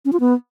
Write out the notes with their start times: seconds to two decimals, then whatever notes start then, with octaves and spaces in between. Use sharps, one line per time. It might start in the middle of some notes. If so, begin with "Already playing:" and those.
0.05 C#4
0.13 F4
0.20 B3